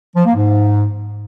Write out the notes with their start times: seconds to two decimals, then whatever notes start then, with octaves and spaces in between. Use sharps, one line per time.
0.16 F3
0.26 A#3
0.35 G#2